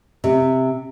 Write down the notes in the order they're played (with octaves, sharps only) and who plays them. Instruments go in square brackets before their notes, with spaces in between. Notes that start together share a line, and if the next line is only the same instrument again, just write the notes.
[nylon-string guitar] C3